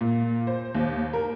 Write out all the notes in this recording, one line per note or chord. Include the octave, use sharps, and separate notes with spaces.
A#2
C5
D#2
A#4